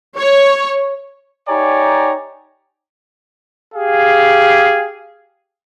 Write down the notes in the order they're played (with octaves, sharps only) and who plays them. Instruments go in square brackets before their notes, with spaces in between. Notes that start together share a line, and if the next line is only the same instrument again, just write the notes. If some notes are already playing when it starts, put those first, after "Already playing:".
[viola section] C#5
[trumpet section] D#4 G4 C#5 D5 G#5 A#5
G4 G#4 F5